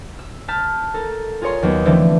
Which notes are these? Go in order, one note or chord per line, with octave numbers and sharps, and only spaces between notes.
E6
A5 F6 G6 B6
A4 A#4
F4 G#4 A#4 C#5 C6
D#2 F#3 B3
D3 E3 F3 A3 C4